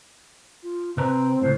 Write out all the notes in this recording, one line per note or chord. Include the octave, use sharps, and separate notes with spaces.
F4
C3 C4 B4 A#5
C#2 A2 C5